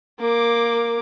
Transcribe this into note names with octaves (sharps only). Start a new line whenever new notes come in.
A#3 D6